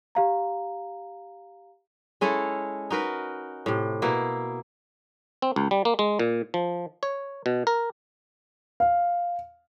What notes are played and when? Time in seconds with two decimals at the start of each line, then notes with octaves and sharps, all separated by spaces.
0.15 G4 F5 A#5
2.21 G#3 C#4 E4 A4
2.90 D#4 F#4 A#4 B4
3.66 A2 C3
4.02 B2 A#3 E4
5.42 C4
5.56 C#2
5.71 G3
5.85 A#3
5.99 G#3
6.19 A#2
6.54 F3
7.03 C#5
7.46 B2
7.67 A#4
8.80 F5